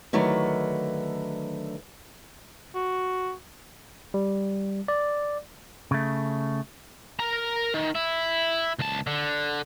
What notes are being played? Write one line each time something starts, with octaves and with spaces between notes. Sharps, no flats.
D3 D#3 F#3 A3 B4
F#4
G3
D5
C#3 A3
A#4 A#5
D#3
E4
C#2 A5
D3